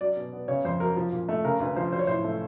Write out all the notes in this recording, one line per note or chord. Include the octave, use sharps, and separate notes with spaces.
F#3 D5
B2
B3
C#3 C#5
F2 C5
F#3 A#4
F3
A#2
A3
C#3 A#4
D2 B4
F3 C5
F#3 C5
C#5
A2 C5
A3